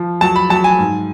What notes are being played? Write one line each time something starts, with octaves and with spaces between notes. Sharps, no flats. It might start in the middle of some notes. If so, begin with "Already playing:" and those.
Already playing: F3
F#3 A5
B5
F#3 A5
G#5
G#2